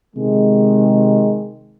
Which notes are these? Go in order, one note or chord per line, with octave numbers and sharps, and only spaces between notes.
C3 D#3 G#3